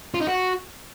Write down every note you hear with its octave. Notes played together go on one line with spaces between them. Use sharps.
F4
D#4
F#4